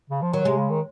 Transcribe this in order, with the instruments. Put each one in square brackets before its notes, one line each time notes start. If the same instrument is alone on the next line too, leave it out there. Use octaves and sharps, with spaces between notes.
[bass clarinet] C#3
F3
[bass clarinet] D#3 [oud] F#3
[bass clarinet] C3 [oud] G#3
[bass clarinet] C#3
D#3